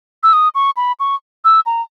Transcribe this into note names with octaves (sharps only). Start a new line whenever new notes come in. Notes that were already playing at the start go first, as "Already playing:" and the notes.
E6
D#6
C#6
B5
C#6
E6
A#5